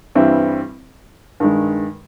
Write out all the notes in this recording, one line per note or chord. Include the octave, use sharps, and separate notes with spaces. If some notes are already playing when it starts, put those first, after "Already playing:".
G2 E3 G3 C4 E4
G2 D#3 G#3